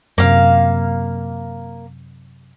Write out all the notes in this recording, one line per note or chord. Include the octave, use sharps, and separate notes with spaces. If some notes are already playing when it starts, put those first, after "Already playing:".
F#2 C3 A#3 F5